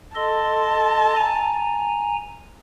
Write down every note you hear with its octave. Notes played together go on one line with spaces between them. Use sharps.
A4 D#5 A5 C6
G#5 A#5